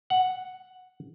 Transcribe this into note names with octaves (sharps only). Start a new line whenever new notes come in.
F#5